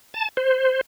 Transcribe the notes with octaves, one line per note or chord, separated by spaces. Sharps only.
A5
C5